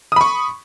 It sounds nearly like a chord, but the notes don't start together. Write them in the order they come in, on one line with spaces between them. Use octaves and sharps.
D#6 B5 C#6